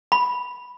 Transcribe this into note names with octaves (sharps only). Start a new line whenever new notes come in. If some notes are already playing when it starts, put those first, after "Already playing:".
B5